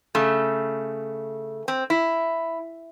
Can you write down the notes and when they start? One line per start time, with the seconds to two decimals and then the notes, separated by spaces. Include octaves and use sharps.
0.15 C#3 A3
1.68 C4
1.90 E4